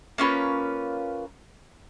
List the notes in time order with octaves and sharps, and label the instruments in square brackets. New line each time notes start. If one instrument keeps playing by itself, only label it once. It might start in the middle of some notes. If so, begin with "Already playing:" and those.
[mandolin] A#3 C#4 F4 B4